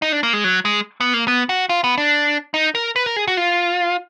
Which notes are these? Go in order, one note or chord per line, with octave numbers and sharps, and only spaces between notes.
D#4
D4
A#3
G#3
F#3
G#3
B3
A#3
B3
F#4
F4
B3
D4
D#4
A#4
B4
A#4
G#4
F#4
F4